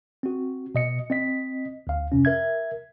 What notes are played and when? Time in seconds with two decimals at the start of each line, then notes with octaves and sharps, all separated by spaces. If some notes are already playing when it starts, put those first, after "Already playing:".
0.23 C4 F#4
0.75 B2 D#5 C#7
1.10 C4 D#5 B6
1.87 D2 F5
2.12 F2 C3 C#4
2.25 A#4 E5 G#6